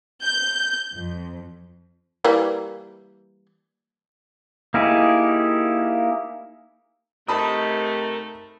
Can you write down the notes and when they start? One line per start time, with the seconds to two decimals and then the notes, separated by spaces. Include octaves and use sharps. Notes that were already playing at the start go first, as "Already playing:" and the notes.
0.23 G6
0.94 F2
2.24 E3 G3 A#3
4.74 A#3 D#4 E4 G4 G#4
7.28 C3 A3 D#4 A#4 A5 B5 D#6